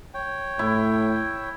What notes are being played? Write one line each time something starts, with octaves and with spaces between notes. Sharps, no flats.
C#5 G5
A2 E4